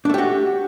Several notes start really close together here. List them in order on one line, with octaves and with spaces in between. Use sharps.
D4 A3 G4 F#4